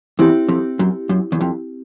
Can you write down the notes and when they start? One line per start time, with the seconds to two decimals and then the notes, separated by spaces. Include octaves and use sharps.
0.19 E2 C4 E4 G4
0.48 F2
0.79 F#2
1.09 F#2
1.32 E2
1.41 F2